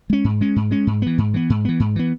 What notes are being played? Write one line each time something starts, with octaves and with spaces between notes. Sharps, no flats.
G#3 C#4
G#2
G#3 C#4
G#2
G#3 C#4
G#2
E3 B3
G#2
E3 B3
G#2
E3 B3
G#2
E3 B3